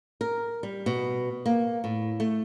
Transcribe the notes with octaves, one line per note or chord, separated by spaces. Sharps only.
A#4
G3
B2
A#3
A2
A3